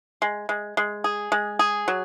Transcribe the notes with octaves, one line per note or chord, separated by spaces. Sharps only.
G#3
G#3
G#3
G#4
G#3
G#4
F#3